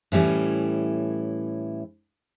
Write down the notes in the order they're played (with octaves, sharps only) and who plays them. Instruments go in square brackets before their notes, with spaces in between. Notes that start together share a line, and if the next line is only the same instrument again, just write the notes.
[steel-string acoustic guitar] A2 E3 G3 C#4 E4